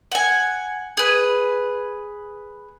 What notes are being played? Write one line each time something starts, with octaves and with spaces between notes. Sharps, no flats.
F#5 G#5
G#4 B4